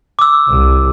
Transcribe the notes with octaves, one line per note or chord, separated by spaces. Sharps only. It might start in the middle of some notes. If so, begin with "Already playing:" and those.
D6 E6
C2